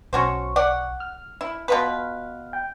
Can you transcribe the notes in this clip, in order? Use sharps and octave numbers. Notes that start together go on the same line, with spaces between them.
B1 C#4 F#4 C5 C#6
D5 F#5
F6
E4
B2 F4 B4
G5